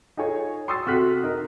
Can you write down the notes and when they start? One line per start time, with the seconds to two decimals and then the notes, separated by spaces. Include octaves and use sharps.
0.17 D#4 F4 G#4 A4 C#5
0.68 C6 C#6 D#6 E6 A6 C7
0.87 C3 F#4 A4 F6 F#6 B6
1.23 D#4 A#4